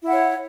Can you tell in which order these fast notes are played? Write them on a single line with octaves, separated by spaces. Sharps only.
E4 F#5 C#5